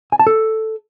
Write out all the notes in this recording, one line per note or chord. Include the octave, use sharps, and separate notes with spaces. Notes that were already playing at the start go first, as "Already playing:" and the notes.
G#5
A5
A4